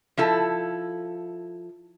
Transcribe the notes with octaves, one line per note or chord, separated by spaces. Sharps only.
F3 E4 A4